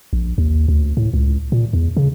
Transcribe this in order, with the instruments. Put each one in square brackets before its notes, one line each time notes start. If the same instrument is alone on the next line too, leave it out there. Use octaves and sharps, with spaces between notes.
[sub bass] A#1
D#2
D2
A2
C#2
A#2
E2
C#3